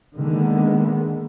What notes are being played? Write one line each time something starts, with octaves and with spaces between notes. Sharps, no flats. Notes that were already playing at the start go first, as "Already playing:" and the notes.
D3 D#3 G#3 A#3 B3